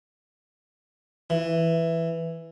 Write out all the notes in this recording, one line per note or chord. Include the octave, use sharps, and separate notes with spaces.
E3